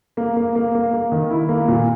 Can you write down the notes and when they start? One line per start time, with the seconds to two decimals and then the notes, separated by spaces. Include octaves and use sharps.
0.17 A#3
0.36 A#3
0.55 A#3
0.75 A#3
0.93 A#3
1.12 D#3
1.30 E4
1.49 A#3
1.68 A#2